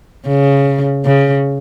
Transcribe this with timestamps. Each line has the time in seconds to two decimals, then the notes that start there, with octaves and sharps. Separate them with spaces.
0.27 C#3
1.05 C#3